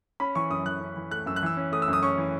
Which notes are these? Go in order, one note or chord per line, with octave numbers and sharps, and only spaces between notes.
C#4 B5
E3 C#6
F#2 D#6
E3 F#6
C#4
E3
A3 F#6
F#2 E6
F#6
E3 E6
C#4
A3 D#6
E6
F#2
D#6
C#4 C#6
E3